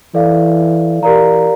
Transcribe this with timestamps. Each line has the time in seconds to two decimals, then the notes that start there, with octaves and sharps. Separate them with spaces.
0.14 E3 A4 D5 F5
1.02 E3 G4 A#4 D5 F5 A#5